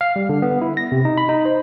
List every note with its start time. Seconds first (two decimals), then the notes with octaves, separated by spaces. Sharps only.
0.01 F5
0.16 G3
0.29 D3
0.42 B3
0.61 E4
0.77 A#6
0.92 C3
1.05 D#4
1.18 B5
1.29 D#4
1.45 C5